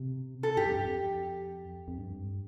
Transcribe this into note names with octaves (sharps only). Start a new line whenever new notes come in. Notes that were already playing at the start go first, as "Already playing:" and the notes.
Already playing: C3
A4
G2 G4
F2
F2
F2
G2